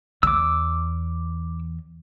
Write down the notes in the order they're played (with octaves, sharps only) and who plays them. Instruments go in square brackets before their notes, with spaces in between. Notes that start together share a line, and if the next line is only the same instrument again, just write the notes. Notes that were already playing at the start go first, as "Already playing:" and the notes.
[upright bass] E2 [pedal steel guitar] D6 E6